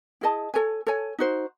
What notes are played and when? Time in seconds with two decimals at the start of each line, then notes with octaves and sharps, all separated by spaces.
0.21 E4 G#4 D#5 A5
0.54 A4 C#5 G#5
0.87 A4 C#5 G#5
1.19 D#4 F#4 C5